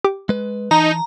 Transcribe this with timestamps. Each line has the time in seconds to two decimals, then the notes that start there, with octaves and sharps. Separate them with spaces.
0.04 G4 D6
0.29 G#3 B4
0.71 E3 D#4 A5 A#5